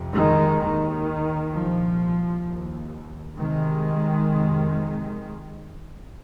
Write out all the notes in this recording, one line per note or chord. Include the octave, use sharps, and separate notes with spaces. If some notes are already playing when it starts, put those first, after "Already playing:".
Already playing: F2 C3
D#3 G#3
D#2 D#3
C2 A#2 F3
D#2
C2 C3 D#3 G#3
F2 C3